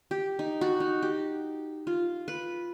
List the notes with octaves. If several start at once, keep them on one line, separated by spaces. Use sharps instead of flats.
G4
D#4
F#4
D#4
G4
F4
B4